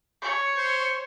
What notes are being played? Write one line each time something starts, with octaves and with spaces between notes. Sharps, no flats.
C#5
C5